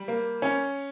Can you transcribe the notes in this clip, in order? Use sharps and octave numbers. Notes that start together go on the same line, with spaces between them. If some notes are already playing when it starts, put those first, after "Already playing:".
Already playing: G3
A#3
C#4